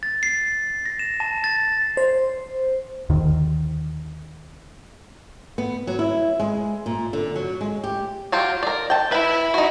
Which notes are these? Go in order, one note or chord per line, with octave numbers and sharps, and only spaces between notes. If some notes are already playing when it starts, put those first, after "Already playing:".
A6
C7
A#6
E7
A5
A6
C5
D#2 D3 D#3
B3
F#3
E4
G#3
A#2
D3
F#3
G#3
G4
F#3 F4 G4
A#4 D5
G5 A5
E4 B4 E5 B5
D#4 F#4